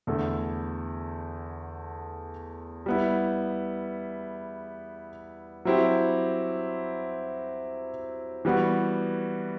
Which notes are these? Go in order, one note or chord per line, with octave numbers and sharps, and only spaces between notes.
E2 D3 A3 E4 A4
G3 B3 E4
F#3 C4 E4 G4
E3 G3 B3 F#4